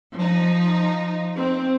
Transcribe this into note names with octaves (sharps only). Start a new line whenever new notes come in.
F3 D#4
C4